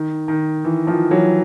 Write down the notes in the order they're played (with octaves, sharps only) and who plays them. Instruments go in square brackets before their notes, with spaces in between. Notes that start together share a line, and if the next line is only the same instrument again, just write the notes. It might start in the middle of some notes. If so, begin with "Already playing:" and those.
Already playing: [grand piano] D#3
D#3
E3
D#3 F3
E3 F#3